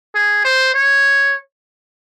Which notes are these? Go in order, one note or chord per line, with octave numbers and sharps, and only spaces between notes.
G#4
C5
C#5